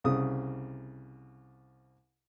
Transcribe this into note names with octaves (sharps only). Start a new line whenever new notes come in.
C2 C#3 D#6